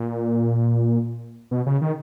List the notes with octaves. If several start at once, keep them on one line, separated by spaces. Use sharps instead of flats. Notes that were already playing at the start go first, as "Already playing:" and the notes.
Already playing: A#2
B2
C#3
D#3